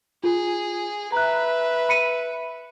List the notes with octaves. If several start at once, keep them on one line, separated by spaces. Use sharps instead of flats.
F4 G#4
B4 E5 A#5 F#6
B5 C#7 D#7